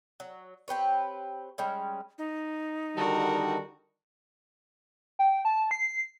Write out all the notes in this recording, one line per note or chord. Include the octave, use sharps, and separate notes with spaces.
F#3
C4 G4 B4 C#5
G3 G#3 C#4
D#4
D3 D#3 G3 F#4 A#4 A5
G5
A5
C7